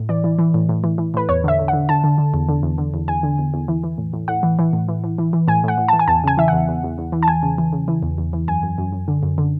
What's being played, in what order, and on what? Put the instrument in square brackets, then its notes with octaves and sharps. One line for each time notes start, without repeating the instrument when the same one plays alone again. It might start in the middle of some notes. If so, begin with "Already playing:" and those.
Already playing: [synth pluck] A2
E3 D5
E3
E3
A2
A2
E3
E3
A2 B4
E2 C#5
D3 E5
D3
F#5
D3
D3 A5
D3
D3
E2
D3
E2
D3
E2
E2 G#5
D3
E2
E2
E3
E3
A2
A2
A2 F#5
E3
E3
A2
E3
E3
E3
E3
A2 G#5
A2 F#5
A2
E3 A5
G#5
E2 A5
C#3 G#5
E3 E5
E2 F#5
E2
E2
E2
E3
A5
E2 G#5
C#3
E3
C#3
E3
E2
E2
E3
F#2 G#5
F#2
F#2
F#2
D3
F#2
D3